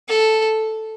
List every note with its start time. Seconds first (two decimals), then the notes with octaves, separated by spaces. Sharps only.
0.08 A4